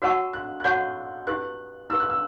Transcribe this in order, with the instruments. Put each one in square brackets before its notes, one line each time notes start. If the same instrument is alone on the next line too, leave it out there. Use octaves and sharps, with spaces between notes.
[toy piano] F#4 C#5 F#5 A5 C#6 [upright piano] E6
[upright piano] F#6
F#6
[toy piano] F#4 C#5 F#5 A5 C#6 [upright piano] G6
[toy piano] E4 G4 B4 [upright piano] F#6
[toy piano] E4 G4 B4 [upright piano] E6
[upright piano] F#6
E6